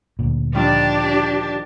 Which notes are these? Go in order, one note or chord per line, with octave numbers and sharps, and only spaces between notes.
D2 A#2
D#3 F3 G3 D4 G4